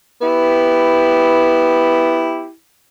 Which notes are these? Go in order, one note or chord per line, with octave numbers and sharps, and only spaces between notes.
B3 E4 G4